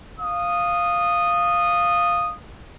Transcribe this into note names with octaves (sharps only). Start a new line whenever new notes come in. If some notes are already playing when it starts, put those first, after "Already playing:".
F5 D#6